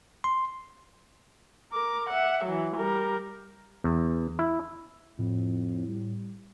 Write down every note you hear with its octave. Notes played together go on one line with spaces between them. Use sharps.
C6
A#4 D6
E5 F#5
E3 F#3
G3 A#4
E2
E4
F2 A2
G3